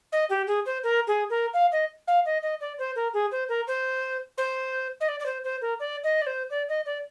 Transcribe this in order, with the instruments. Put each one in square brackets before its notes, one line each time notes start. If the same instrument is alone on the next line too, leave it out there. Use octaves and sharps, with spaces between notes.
[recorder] D#5
G4
G#4
C5
A#4
G#4
A#4
F5
D#5
F5
D#5
D#5
D5
C5
A#4
G#4
C5
A#4
C5
C5
D#5
D5
D5
C5
C5
A#4
D5
D#5
D5
C5
D5
D#5
D5